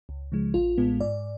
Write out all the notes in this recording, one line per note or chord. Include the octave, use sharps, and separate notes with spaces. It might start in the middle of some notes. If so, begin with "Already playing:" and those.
C#2
C#3 F3 G#3
A1 F4
A2 G#3 B3
G#2 D5